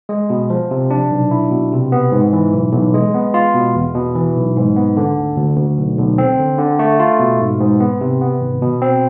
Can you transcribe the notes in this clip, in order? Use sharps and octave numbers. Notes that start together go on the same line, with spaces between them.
G#3
B2
F3
C3
D4
B1
E4
B2
C3
B3
G#2
E3
B1
B1
G#3
B3
F4
B2
E2
B2
E3
B1
G#2
B3
D3
D2
D2
D2
B1
B1
C4
D3
D3
A3
F4
B2
G#2
G#2
B3
C3
B3
G#1
B2
C4